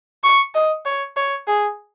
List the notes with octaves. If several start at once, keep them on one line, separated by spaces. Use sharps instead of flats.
C#6
D#5
C#5
C#5
G#4